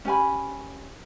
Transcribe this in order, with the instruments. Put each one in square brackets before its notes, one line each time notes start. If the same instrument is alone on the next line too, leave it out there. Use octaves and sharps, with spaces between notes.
[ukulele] C#4 G4 G#5 B5